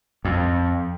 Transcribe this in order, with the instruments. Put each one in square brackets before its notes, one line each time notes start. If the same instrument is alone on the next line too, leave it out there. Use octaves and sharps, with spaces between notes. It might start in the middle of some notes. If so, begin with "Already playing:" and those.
[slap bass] F2